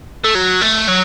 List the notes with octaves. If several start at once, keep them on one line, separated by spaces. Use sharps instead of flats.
A3
F#3
A3
F#3